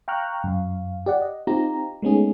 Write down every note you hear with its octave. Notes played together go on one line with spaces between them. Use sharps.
F5 G5 A#5 C#6 F6 F#6
F#2 F5
G4 D5 F#5
D#5
C4 D#4 F4 G4 A#5
G#3 A3 B3 C#4 D#4 G#4